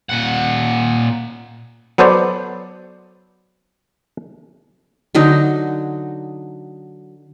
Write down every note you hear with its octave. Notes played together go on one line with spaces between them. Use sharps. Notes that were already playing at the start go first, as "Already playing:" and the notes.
A#2 F#5
F#3 B3 A4 C5 D5
D3 F#3 D#4